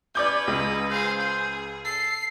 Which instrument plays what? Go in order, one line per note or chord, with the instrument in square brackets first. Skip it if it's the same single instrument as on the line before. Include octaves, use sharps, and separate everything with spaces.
[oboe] C#4 [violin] B4 [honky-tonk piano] D5 D6 G6
[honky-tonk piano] C#2 [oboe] D#5
[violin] G#4 F5 [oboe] C5
[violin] G#4
[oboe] A4 [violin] C7